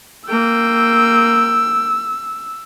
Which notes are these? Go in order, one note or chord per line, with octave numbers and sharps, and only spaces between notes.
A#3 G5 E6